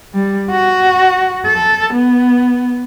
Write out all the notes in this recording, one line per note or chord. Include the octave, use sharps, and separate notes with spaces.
G3
F#4
A4
B3